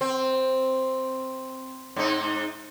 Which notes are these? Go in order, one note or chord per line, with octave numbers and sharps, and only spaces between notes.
C4
G#2 D#4